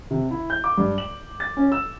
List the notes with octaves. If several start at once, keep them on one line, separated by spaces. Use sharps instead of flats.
C3
E4
G6
D6
G2
F#7
A6
C#4
E6